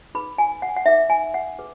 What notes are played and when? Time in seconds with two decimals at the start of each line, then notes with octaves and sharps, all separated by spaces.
0.15 D#4 G#4 B4 B5
0.38 G#5
0.62 F#5
0.69 G#5
0.76 F#5
0.86 D#4 G#4 B4 E5
1.10 G#5
1.34 F#5
1.59 G#4 B4